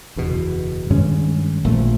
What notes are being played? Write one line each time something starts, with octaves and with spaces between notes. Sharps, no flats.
F#1 E2 B2
G2 D#3 G#3 C#4
A#1 A#2 F3 A3